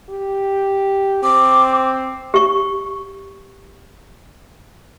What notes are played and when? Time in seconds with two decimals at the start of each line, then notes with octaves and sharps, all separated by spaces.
0.10 G4
1.23 C4 D6
2.34 G4 C#6